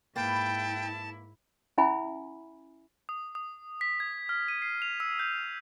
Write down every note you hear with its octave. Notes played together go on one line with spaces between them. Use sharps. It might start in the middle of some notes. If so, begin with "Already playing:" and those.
G#2 A#3 E4 B4 G5 A5 A6
C#4 E4 E5 G#5 B5
D#6
D#6
B6
G#6
F6
D#7
C7
F7
E6
G6